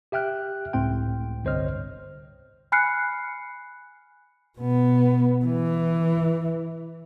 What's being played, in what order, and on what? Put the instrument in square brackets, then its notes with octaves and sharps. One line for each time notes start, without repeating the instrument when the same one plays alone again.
[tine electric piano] G4 E5 G5 F6 F#6
C#2 A2 C4 G5
G1 C2 C5 C#5 D#5 F6
[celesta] G#5 B5 F6 F#6 C7 C#7
[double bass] B2 B3
E3